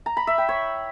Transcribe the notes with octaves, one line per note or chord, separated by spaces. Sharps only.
A#5
B5
E5
G5
C#5